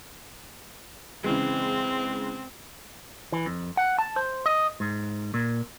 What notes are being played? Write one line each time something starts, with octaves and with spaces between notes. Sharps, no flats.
C#3 E3 G#3 C4
E3
F2
F#5
A5
C5
D#5
G#2
A#2